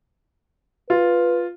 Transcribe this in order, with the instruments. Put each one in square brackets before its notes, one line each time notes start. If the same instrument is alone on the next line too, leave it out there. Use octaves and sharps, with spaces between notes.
[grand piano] F4 [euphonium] B4